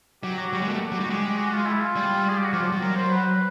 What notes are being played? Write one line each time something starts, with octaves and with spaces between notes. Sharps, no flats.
F#3 G4
F#4
G3 F#4
G#3
A3 A#3 G4
F#3
G3 F#4
G#3 G4
F#4
F4
E4
F4
G3
G#4
G4
F#4
F3 F4
F#3
G3
F#3 A#4
C5
B4